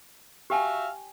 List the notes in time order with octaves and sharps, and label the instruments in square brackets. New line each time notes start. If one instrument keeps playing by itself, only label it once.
[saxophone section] F#4 E5 F5 [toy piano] G4 G5 G#5